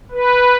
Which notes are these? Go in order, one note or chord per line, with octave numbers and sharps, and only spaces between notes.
B4